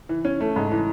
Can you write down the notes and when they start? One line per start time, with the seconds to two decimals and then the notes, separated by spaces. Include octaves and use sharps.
0.09 E3
0.25 C#4
0.41 A3
0.56 G#2
0.71 E3